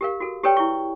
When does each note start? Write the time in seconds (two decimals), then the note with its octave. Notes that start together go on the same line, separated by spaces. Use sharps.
0.01 G4 A#4 F5
0.20 F#4 A4
0.44 G4 A4 B4 C#5 D5 G5
0.57 E4 C#6